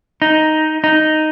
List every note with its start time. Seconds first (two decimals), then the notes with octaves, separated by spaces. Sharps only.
0.22 D#4
0.84 D#4